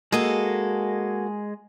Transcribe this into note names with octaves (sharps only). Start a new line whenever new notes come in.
G#3 A#3 F#4 G#4 A4 D#5